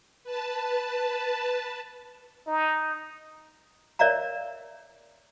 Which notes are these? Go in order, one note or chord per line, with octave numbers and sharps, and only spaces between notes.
B4 A5
D#4
A#4 C#5 D5 E5 F5 A#5